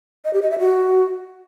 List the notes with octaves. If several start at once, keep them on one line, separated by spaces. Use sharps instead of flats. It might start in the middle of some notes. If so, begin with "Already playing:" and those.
D#5
G4
D#5
E5
F#4